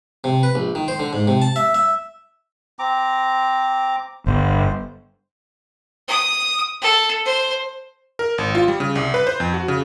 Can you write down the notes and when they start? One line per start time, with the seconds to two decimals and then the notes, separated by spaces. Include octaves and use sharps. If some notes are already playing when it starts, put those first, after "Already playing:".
0.24 C3
0.43 B4
0.55 A#1
0.75 D#3
0.88 C5
0.99 D3
1.13 G#2
1.28 C3
1.42 A5
1.56 E5
1.75 E5
2.79 C4 A#5 D6
4.27 G1 C5
6.08 D#6
6.82 A4
7.26 C5
8.19 A#4
8.38 G#1
8.55 F4
8.68 G3
8.80 C#3
8.95 C2
9.14 B4
9.27 C5
9.40 F2
9.54 F#4
9.68 C#3